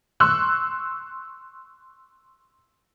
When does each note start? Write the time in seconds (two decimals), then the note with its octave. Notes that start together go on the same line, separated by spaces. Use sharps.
0.20 C6 C#6 E6 F#6